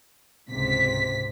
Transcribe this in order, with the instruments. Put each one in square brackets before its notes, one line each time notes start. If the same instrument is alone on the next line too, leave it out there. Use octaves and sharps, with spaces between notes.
[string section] C#2 G#2 C3 B6